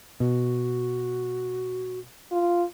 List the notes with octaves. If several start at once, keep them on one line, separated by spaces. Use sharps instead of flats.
B2 F#4
F4